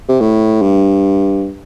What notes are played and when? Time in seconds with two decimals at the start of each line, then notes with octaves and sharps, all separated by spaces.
0.09 C3
0.20 A2
0.62 G2